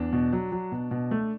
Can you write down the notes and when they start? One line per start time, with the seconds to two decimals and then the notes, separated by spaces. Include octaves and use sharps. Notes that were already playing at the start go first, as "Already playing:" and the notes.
Already playing: E2 D4
0.13 B2
0.33 F#3
0.52 F#3
0.72 B2
0.91 B2
1.11 A3